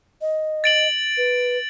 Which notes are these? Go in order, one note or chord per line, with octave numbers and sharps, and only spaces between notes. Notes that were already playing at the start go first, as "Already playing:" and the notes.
D#5
A6 D7 F#7
B4